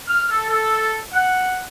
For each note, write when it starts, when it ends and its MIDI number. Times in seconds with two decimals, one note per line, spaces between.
0.08 0.29 89
0.30 0.48 69
0.49 0.98 69
1.13 1.62 78